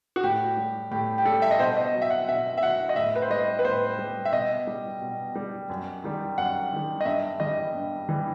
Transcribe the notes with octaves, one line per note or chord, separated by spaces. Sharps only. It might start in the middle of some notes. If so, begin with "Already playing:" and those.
F#4
A2 G4
G3
A2 G4
G4
G3 A4
E5
D#5
B2 C5
D#5
F#3
E5
F#5
B2 E5
E5
F#3 F#5
D#5
A2 E5
B4
C5
G3 D#5
B4
A2 C5
G3
E5
B2 D#5
G3
B2
G3
F#2
D#3 G3
F#2 F#5
D#3 G3
D#5
G2 E5
E3 G3 D#5
G2
E3 G3